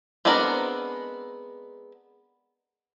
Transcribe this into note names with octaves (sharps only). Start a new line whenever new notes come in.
G#3 B3 C4 D4 A#4